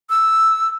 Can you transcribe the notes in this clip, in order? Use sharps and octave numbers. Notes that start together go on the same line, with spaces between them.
E6